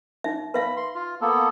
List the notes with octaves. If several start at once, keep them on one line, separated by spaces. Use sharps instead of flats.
D#4 E5
B4 E5 F5 B5
C6
F4
A#3 B3 A4